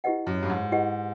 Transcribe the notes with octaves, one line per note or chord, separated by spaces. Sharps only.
E4 G4 B4 D#5 F#5
F#2
G2
G#2
E4 G4 B4 D#5 F#5